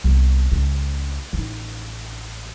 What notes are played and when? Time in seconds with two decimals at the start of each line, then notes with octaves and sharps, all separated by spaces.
0.04 C2 B3
0.52 C#2 C#4
1.33 A1 D#4